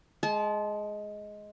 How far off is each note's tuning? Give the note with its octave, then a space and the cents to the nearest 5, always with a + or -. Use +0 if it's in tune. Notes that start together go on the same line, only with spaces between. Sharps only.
G#3 +10 A5 -30